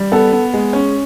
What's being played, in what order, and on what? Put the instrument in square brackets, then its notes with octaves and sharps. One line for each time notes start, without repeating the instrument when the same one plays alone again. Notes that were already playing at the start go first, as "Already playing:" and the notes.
Already playing: [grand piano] G3
[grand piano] B3 [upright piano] A4
[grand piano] B3
G#3
C#4